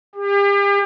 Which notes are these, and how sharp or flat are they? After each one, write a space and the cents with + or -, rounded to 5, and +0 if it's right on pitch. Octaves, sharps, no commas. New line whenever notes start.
G4 +40